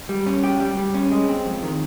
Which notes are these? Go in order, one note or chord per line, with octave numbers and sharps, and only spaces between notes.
G3
C#4
G4
G3
G3
C#4
G#3
C4
F2
D#3